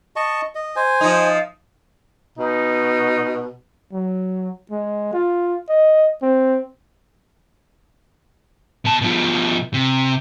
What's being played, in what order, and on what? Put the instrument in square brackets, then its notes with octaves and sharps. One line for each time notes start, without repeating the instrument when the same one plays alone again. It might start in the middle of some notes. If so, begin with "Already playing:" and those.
[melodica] D#5 A5 C#6
D#5
C5 G#5
[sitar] F3 D#4
[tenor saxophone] B2 [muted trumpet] D#4
[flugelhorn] F#3
G#3
F4
D#5
C4
[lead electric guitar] B2 A5
B2 F3
C3